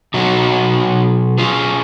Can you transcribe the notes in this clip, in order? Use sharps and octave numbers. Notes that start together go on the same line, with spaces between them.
B2 F#3 D#4 F#4
F4 G#4